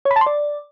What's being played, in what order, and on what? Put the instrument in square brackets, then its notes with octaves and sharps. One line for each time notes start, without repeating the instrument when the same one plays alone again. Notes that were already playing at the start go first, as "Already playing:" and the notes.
[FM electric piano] C#5
B5
A5
C6
D5